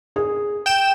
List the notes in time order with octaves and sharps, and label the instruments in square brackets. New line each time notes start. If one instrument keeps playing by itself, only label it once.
[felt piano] G#4
[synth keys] G5 E7